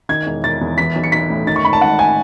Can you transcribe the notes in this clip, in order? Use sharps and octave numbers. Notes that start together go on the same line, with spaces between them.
D#3 G#6
E1
E1 A6
E2
E3 B6
B1
C#7
B1 B6
A2
D#3 A6
C#6
G#1 B5
A5
G#1 F#5
G#5